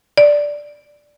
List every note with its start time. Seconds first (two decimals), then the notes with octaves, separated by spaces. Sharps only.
0.17 D5